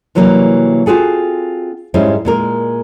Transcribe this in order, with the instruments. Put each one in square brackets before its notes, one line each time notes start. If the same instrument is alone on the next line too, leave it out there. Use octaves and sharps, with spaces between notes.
[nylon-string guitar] C3 E3 F#3 G3 A#3
C4 F4 F#4 G#4 A4
G#2 G3 G#3 C#4 E4 C5
A#2 G#3 A#4